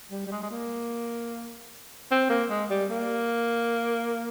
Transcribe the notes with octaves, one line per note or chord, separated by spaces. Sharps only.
G3
G3
G#3
G#3
A#3
C4
A#3
G#3
G3
A#3